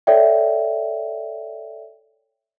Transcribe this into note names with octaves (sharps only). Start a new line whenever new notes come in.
A4 C#5 D5 E5 G5